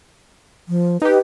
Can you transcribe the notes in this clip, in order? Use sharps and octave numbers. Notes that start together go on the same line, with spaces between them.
F3
D#4 G4 B4